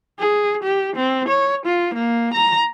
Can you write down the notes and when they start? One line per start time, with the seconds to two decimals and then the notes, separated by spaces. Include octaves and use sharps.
0.19 G#4
0.63 G4
0.96 C4
1.29 C#5
1.66 F4
1.94 A#3
2.34 A#5